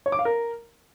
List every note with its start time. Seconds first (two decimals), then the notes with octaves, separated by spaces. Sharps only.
0.06 C#5
0.12 D6
0.19 F5
0.25 A#4